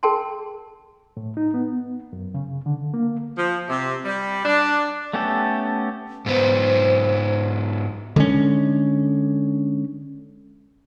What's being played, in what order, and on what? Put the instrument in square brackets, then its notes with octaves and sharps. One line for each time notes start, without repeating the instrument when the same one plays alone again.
[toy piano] G#4 A#4 G5 A5 C6
[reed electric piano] A2
D#4
B3
F#2
C#3
D3
A#3
[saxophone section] F3
C3
G3
D4
[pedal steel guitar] A3 B3 C#4 G4 A4
[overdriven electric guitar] G#2 B3 [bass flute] C5
[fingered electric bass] D3 G#3 C#4